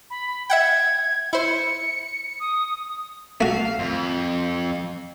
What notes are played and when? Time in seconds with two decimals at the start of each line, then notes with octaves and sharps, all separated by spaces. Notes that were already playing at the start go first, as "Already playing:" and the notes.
0.10 B5
0.50 E5 F#5 G5 G#6
1.33 E4 C5 C#7
2.40 D#6
3.41 A3 F#4 F5
3.79 F2